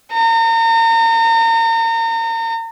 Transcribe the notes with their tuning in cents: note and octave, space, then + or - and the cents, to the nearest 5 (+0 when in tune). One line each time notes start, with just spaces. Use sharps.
A#5 -35